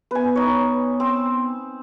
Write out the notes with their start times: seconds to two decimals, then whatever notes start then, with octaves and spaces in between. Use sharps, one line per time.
0.11 B3 B4 G#5
0.36 D#4 C#5
1.00 C4